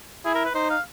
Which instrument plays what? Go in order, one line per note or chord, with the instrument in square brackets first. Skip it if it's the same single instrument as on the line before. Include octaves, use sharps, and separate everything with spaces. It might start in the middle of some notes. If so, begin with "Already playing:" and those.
[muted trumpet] E4 [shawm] G#4
[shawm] A#4
B4
[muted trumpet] D#4 [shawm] C5
[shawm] F5